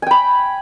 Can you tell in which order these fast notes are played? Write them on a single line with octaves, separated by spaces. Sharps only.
G#5 G5 B5